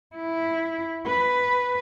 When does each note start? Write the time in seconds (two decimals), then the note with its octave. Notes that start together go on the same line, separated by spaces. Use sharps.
0.16 E4
1.07 B4